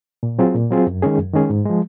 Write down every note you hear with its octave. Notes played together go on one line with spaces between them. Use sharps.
A#2
F#3 C4 F4 G#4
A#2
F#3 C4 F4 G#4
F#2
D#3 G#3 C#4 G#4
F#2
D#3 G#3 C#4 G#4
G#2
F3 G#3